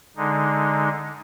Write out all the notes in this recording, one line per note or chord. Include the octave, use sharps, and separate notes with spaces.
D3 G#3 D#4